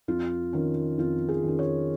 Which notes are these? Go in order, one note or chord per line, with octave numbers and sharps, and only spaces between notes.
F2 F4
D#3 C#4
F2 F4
G#4
D#3 C#4
C#5